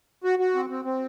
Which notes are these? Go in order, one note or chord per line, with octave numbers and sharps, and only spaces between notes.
F#4
F#4
C4
C4
C4